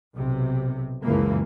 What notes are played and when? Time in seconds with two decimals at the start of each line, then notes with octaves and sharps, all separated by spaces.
0.15 B1 C3
1.03 F#1 C#2 C#3 E3 A#3